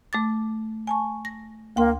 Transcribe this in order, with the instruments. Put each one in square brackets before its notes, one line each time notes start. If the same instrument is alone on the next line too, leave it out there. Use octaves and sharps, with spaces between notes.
[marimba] A3 D6 A6
G#5 A5 C#6
A#6
[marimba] D2 G5 C6 [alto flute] A#3